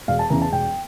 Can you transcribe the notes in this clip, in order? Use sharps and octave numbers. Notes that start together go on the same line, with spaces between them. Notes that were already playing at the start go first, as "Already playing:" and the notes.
E1 F5
A5
E2 C#3 E3 A#5
A5
E1 G5